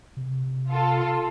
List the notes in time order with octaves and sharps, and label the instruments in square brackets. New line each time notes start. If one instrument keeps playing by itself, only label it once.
[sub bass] C3
[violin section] F4 A4